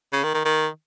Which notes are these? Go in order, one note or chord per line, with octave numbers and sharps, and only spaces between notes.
C#3
D#3
D#3
D#3